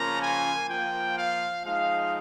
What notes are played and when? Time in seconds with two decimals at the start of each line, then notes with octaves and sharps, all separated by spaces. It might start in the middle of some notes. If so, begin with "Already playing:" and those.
Already playing: C#3 F3 A#3 C#4 F4 A#5
0.23 G#5
0.70 F3 A#3 F4 G5
1.18 F5
1.65 F3 G#3 D#4 F5